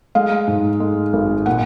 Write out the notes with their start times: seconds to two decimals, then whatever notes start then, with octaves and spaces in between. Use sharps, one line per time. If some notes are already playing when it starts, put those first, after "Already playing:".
0.15 G#3 F5
0.48 G#2
0.80 G#3
1.13 G#1
1.46 A#2 F#5